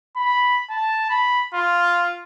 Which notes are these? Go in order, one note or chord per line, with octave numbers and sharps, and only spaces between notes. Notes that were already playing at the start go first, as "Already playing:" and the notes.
B5
A5
B5
F4